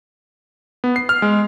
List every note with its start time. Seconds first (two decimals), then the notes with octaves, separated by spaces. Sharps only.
0.84 B3
0.96 C7
1.09 F6
1.22 G#3